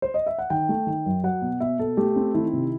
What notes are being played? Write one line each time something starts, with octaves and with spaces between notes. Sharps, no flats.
C5
D#5
E5
F#5
D#3 G5
A3
D#3
F#2
F#3 F#5
B2
B2 E5
B2 A4
A3 G4
C4
D#3 E4
C3